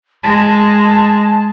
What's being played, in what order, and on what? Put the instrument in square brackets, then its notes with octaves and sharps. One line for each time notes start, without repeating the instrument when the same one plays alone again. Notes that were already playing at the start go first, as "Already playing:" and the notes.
[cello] G#3 [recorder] A5